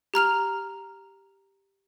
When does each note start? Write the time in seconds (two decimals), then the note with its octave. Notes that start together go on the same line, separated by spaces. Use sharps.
0.14 G4 A#5 F6 F7